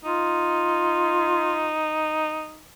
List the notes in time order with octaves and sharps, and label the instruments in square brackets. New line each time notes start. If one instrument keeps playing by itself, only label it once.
[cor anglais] D#4 [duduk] F4